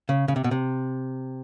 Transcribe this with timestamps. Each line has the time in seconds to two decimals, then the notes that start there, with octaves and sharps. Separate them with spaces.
0.09 C#3
0.28 C#3
0.36 C3
0.44 B2
0.51 C3